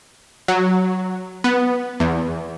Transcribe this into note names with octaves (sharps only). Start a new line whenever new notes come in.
F#3
B3
E2